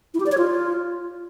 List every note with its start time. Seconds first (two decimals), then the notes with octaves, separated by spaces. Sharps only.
0.14 E4
0.20 G4
0.26 D5
0.32 C#5
0.38 F4